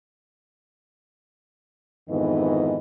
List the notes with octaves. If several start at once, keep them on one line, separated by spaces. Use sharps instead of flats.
F2 G#2 D#3 E3 B3 D#5